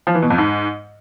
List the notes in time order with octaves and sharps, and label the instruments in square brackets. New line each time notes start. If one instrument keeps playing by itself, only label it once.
[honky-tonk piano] F3
E3
B2
F2
G#2